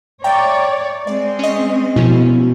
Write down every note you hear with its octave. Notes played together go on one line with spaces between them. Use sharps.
C#5 D5 E5 G5 A#5
G#3 C4 D5
C#4 D#5
B2 F3 C#4 E4